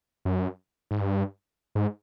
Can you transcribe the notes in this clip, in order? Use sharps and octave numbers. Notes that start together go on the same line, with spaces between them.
F#2
G#2
G2
G#2